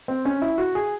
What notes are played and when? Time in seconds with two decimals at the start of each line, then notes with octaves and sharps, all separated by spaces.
0.08 C4
0.25 C#4
0.42 E4
0.58 F#4
0.75 G#4